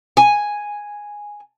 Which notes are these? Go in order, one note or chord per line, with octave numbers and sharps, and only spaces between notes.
G#5